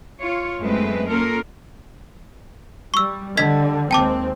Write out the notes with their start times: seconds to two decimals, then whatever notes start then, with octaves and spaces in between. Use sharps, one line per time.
0.19 F4 C#5
0.59 F#2 G#3 A3 B3 C4 B4
1.07 A#3 C#4 F4 A4 A#4
2.94 G3 C#6 E6
3.37 D3 G3 D#5 G#6 B6
3.91 D#2 G#3 C4 G5 A5 D6